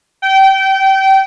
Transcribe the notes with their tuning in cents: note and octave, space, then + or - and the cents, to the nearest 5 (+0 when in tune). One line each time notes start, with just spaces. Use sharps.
G5 -25